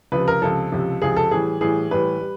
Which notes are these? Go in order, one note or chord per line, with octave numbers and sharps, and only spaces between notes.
C#2 C3 F3 B4
A#4
C#2 C3 F3 A4
C#2 C3 F3
C#2 C3 F3 G#4
A4
A2 E3 G3 G#4
A2 E3 G3 G#4
A2 E3 G3 B4
G3